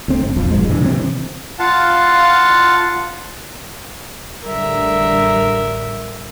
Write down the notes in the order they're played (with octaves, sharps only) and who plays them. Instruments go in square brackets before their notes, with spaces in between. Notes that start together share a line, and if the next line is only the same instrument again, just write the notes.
[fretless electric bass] D2 C4
G1
E1 A#1 F2 F3
D#1 G2 F3 G#3
G2 A#2 E3
C3 E3 G3 C4
[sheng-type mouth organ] F4 F5 F#5 A5
[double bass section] A1 D3 G3 [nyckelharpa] A#4 E5